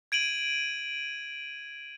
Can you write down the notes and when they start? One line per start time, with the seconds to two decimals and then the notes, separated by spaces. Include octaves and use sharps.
0.12 G#6 D7 D#7 F#7